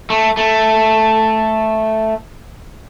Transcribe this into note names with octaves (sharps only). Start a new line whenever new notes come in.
A3
A3